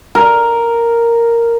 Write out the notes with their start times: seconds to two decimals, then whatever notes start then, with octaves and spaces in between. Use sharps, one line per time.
0.15 A#4